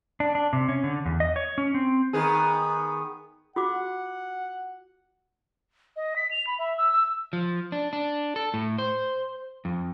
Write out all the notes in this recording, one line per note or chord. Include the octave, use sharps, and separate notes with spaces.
D4
D4
C3
C#4
D3
E2
D#5
C#5
C#4
C4
D#3 B3 G#4
F4 F#4 F#5 D6
D#5
B6
F7
B5
E5
E6
E6
F3
D4
D4
A4
A2
C5
F2